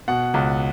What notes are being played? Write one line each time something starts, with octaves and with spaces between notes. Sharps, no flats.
B2 F#5
C#2